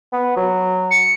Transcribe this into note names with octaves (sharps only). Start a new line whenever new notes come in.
B3
F#3
C#7